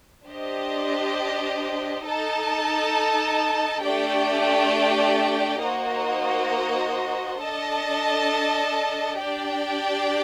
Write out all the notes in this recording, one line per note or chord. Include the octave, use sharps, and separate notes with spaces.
D4 G4 C5 D#5
D#4 A4 D#5 A5
A3 D4 G4 D5 G5
A#3 D#4 F#4 C5 D#5
D4 A4 D#5 A5
D4 G4 D5 G5